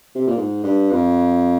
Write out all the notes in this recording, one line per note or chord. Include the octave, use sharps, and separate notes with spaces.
C3
A#2
G#2
G2
F2